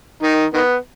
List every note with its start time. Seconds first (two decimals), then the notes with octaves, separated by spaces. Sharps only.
0.23 D#3 D#4
0.54 D#3 B3